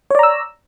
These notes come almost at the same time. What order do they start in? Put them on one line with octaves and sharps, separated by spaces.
C#5 D5 A#5 E6